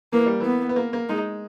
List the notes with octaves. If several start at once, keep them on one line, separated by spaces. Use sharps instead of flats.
E3 A#3
G3
E3 B3
B3
A#3
A#3
G#3 D#4